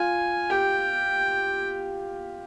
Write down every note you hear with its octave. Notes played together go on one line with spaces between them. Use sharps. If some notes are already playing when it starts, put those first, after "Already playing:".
Already playing: F4 G#5
G4 G5